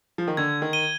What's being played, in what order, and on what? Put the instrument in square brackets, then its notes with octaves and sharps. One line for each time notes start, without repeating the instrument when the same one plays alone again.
[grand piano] F3
D#3
[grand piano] D3 [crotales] G#6
[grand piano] D#3
[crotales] D#7 G7